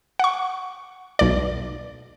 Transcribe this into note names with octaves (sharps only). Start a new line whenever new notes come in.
F#5 C#6
B1 D5